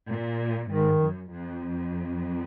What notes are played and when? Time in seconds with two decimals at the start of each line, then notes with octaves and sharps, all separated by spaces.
0.09 A#2
0.70 G#2 D#3
1.00 F#2
1.30 F2